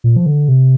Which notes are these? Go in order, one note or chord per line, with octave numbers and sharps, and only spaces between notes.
A#2
F3
D3
C3